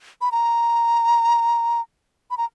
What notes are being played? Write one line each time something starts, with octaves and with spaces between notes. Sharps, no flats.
B5
A#5
B5
A#5